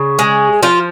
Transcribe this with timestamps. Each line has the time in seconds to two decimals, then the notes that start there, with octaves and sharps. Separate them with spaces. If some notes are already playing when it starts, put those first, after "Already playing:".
Already playing: C#3
0.19 G#3
0.63 F3 F4